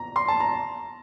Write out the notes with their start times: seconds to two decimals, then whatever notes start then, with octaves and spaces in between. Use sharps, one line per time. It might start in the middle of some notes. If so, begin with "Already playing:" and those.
Already playing: A#5
0.16 C6
0.28 A5
0.40 A#5